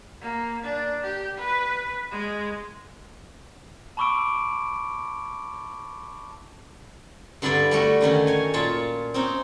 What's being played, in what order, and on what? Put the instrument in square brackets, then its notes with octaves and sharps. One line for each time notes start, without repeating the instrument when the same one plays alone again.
[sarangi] A#3
D4
G4
B4
G#3
[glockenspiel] A5 B5 C#6 D6 E6 D7
[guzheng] G2 D3 E4 B4 D5 B5
G3 A3 F#4
F#2 D3 D#3 C#4
C#5 G#5
A#2 F4 C#5 A5
C4 C#4 D#4